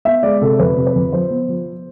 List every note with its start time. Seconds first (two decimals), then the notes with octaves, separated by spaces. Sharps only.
0.05 B3 E5
0.23 G#3 D5
0.41 C3 A4
0.59 F2 B4
0.77 C3
0.87 B4
0.95 F2
1.13 F3 C5
1.31 B3
1.49 F3